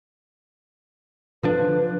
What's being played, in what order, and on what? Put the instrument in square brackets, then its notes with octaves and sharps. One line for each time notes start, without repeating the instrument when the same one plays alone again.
[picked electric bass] D3 F3 D4 [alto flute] B4